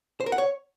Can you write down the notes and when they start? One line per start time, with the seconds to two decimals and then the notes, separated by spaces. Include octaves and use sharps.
0.20 C5
0.26 A#4
0.32 F#5
0.38 C#5